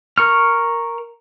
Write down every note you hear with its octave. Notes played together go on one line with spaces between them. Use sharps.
A#4 C#6 F6